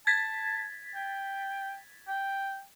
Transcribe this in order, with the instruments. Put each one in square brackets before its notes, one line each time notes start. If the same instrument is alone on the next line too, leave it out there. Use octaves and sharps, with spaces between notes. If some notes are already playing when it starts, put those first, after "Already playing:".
[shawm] A5 [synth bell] G#6 A6 B6
[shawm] G5
G5